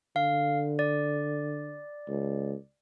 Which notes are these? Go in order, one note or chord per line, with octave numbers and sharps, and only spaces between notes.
D3 F5
D5
C#2